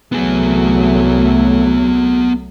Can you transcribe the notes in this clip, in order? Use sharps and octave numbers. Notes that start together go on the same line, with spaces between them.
C2 F#3 A3 B3 G#4